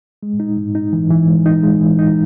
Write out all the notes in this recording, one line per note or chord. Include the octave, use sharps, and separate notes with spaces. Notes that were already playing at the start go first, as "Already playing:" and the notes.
G#3
D#4
G#2
D#4
E3
E3
G#3
D#4
G#3
E3
D#4